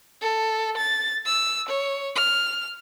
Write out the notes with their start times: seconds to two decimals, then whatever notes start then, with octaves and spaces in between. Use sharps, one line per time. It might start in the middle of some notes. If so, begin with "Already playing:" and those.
0.21 A4
0.77 A6
1.26 E6
1.68 C#5
2.15 F6